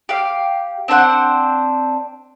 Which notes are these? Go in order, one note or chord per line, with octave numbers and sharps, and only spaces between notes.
G4 F5
C4 D4 C5 F#5